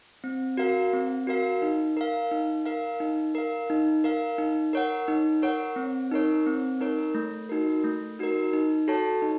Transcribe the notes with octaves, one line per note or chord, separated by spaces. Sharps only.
C4
F#4 A#4 F5
C4
F#4 A#4 F5
D#4
A#4 F5
D#4
A#4 F5
D#4
A#4 F5
D#4
A#4 F5
D#4
A#4 C#5 F#5
D#4
A#4 C#5 F#5
C4
D#4 A#4 C#5
C4
D#4 A#4 C#5
A3
D#4 F#4 A#4
A3
D#4 F#4 A#4
D#4
F#4 A4 C#5 A5
D#4